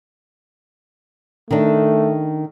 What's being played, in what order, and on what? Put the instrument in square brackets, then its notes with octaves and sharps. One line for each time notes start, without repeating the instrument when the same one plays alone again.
[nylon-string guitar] D#3 D4 [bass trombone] A3